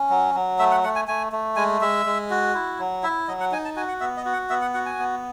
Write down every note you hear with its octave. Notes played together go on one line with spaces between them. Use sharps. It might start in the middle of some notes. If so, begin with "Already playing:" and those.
Already playing: C#4
F#3
F#3
A3 E5
F#5
A3 F#5
G#5
A3 G#5
A3
G#3 G#5
G#3 E5
G#3
F#4
E4
F#3
E4 E5
F#3 D#5
F#5
D#4 G#5
A5
F#4 G#5
F#5
B3 E5
D#5
F#4
F#5
B3 E5
F#5
F#4 F#5
G#5
B3